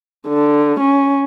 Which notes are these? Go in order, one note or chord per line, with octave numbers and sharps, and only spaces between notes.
D3
C#4